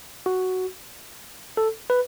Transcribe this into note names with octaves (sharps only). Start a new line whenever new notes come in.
F#4
A4
B4